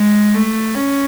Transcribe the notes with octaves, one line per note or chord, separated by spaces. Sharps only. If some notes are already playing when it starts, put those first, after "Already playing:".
Already playing: G#3
A3
C#4